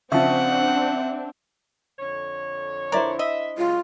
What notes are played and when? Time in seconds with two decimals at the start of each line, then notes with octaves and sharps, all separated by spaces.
0.12 C#3 F3 C4 D4 E5 F#5 A5
1.99 F2 D3 C#5
2.92 D4 E4 A#4 C5 D5
3.19 D#5 E5
3.58 C#3 F#3 G#3 F4